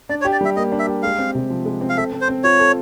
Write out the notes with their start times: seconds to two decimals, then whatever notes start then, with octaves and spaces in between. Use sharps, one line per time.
0.09 D4 D5
0.21 C#5
0.25 G4
0.32 D5
0.41 G3 E5
0.56 A#3 D#5
0.72 D4
0.79 E5
0.87 G4
1.02 G#3 F5
1.19 C4
1.35 C3
1.50 F3
1.66 G#3
1.81 C4
1.89 F5
1.97 A4 E5
2.13 C4
2.21 C5
2.28 C4
2.44 F4 C#5
2.59 A4